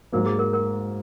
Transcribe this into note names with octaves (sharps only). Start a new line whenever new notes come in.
G#2 F#3 A#3 A#4
G#4
A#4
A#4